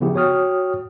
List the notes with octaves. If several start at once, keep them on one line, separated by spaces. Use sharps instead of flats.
C#3 F3 B3 E4 G4 G#4
F#4 C#5 G5 D#6 F6